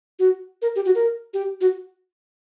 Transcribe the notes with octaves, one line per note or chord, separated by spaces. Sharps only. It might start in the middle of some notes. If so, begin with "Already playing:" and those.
F#4
A#4
G4
F#4
A#4
G4
F#4